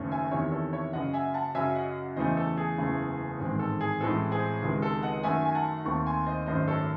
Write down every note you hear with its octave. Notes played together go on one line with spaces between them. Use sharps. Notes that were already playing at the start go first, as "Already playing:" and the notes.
Already playing: F#1 F#2 D#3 A3 C#4
E5 G#5
E2 C3 D#3 C#5 E5
A4 C#5
C#5 E5
F#1 F#2 C#3 D#5 F#5
E5 G#5
F#5 A5
F#2 C#3 F#3 C#4 E5 G#5
D#5 F#5
E2 C#3 E3 A3 C5 D#5
A4
G#4
F#1 E2 C#3 E3 A3
A1 G#2 D#3 G#3 C4
A4
G#4
A1 A2 G#3 C4 A4
G#4 C5
C#2 C3 D#3 G#3
A4
D#5 F#5
F#2 D#3 A3 E5 G#5
G#5
F#5 A5
D#2 D#3 A3 C4 A5 C#6
G#5 C6
C5 D#5
G#1 F#2 D#3 A3 C5 D#5
A4 C#5